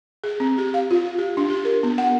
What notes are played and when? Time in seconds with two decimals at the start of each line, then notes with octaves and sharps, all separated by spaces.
0.24 G#4
0.40 C4
0.58 G4
0.74 F5
0.91 F4
1.18 G4
1.37 D4
1.50 G4
1.65 A#4
1.83 B3
1.98 F#5